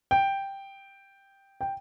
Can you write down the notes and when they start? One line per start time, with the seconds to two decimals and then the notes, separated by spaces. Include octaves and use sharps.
0.11 G5
1.61 G5